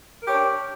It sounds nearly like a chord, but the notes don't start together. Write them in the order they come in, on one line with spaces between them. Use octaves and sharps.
A#4 G4 C#5 D4